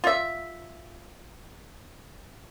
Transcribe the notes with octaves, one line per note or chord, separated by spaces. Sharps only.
F4 E5